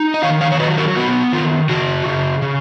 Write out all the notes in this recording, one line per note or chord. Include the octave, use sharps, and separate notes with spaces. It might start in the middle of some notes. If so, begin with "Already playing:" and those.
Already playing: D#4
D#5
D#3 C#5 F5
C#5 F5
C#5
F#3 B4 D#5
F#4 A#4
B3 F#4
D#3 F4
C#3 F#4
C#3
C#3